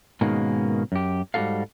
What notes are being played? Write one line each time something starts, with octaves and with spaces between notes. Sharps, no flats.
G#2 B2 D#3 G#3 A#3 C#4
F#2 G4
G#2 G3 E4 F#4 A4 F5